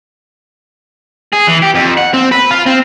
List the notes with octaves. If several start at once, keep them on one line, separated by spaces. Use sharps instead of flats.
G#4
E3
G4
F2
F#5
C4
B4
F4
C4